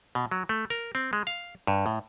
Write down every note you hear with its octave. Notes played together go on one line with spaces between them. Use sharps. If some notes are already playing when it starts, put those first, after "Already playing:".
B2
F#3
A3
A#4
C4
G#3
F5
G2
A2